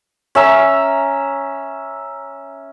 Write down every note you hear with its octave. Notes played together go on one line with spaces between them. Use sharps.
C#4 E5 A#5